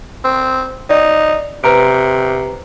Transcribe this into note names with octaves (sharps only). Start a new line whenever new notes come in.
C4
D#4 D5
C3 B4 A#5 D7